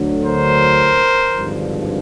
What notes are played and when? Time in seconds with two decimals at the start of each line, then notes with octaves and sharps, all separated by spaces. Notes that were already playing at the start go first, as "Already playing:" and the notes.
Already playing: D2 D3 F#3
0.23 A#4 C5
1.33 G#1 G2 D3 F3